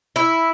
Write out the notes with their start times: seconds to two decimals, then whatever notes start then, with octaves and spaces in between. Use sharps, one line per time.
0.16 E4